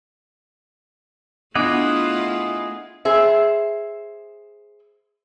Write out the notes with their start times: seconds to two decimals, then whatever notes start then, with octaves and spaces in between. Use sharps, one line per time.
1.55 A3 B3 D4 E4 F4 G#4 D#5 F#5
3.05 G#4 C5 E5